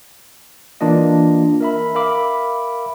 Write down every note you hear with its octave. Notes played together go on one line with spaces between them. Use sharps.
E3 A#3 D4 F4 D#5
A#4 E5 B5
A#4 E5 F5 B5 D6